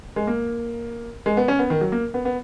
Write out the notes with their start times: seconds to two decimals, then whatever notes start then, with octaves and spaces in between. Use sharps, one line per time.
0.16 G#3
0.27 A#3
1.26 G#3
1.37 B3
1.48 C#4
1.59 B3
1.70 D#3
1.81 F#3
1.92 A#3
2.14 B3
2.25 B3